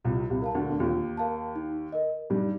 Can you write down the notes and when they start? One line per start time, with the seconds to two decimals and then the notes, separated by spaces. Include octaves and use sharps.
0.04 C2 C3 F4
0.30 C2 C3
0.42 A#4 F5 A5
0.55 D2 D3
0.70 D3
0.80 D#2 D#3 F4
1.17 A#4 F5 A5
1.55 D#4
1.92 A#4 D#5
2.30 G2 G3 D#4